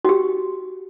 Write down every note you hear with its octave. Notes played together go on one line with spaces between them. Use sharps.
F#4 G4